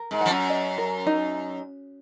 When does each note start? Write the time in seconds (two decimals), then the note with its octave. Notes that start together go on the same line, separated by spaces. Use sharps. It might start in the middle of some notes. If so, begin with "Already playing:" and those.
Already playing: A#4
0.11 G#2
0.21 F3 F#5
0.30 F#2
0.49 D#5
0.78 A#4
1.06 D#4